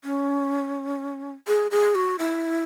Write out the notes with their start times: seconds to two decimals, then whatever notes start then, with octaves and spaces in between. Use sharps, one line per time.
0.04 C#4
1.47 G#4
1.71 G#4
1.95 F#4
2.19 E4